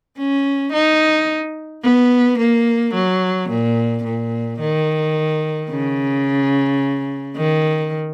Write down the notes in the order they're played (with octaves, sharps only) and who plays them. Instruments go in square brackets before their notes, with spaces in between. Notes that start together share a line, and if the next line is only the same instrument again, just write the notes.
[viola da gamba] C#4
D#4
B3
A#3
F#3
A#2
A#2
D#3
C#3
D#3